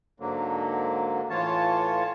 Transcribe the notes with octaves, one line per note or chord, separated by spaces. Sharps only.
G#2 D3 F#3 A#3
A2 E3 F4 C#5 A5